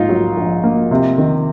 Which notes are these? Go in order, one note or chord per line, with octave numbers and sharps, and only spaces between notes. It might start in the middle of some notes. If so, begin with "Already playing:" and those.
Already playing: A#1 G#2 A#3 D#4 F4
F#3
A#1
A#3
C3
D#3